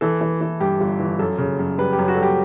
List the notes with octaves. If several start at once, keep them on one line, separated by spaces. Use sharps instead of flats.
E3 A4
E3
E3
G2 G4
G1
E3
F#2 A4
C#3
F#2
G3 B4
G4
F#2
F#4
A4
G3 G4